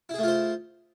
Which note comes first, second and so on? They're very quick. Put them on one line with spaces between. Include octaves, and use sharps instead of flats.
E4 G#4 A3 F4 C5